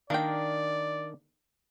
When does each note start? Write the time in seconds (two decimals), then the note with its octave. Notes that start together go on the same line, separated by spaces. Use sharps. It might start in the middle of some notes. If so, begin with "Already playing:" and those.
0.10 D#3 A#3 D4 A#4 D5 G5